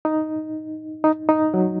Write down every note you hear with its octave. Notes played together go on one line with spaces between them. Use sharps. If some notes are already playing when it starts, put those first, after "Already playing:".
D#4
D#4
D#4
F#3